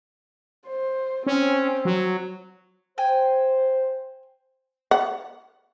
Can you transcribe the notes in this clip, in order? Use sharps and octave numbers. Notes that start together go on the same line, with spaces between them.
C5
C4 C#4
F#3
C5 G5 G#5
F#5